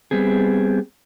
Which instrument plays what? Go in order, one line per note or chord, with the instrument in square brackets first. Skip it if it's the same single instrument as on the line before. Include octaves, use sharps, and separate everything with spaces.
[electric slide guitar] G3 B3 C4 G#4